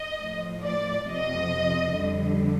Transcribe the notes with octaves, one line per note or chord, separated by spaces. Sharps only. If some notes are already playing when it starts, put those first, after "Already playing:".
Already playing: D#5
A2 F3
D5
F2 C3 F3 D#5
F2 D3 G3